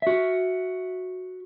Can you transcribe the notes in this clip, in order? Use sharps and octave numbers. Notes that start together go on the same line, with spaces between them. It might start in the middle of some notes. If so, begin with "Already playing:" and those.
F#4 E5